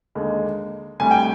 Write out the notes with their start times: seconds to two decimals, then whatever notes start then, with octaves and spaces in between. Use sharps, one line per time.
0.15 D#2 D3 G#3
1.00 D2 C3 G3 G#5
1.11 G5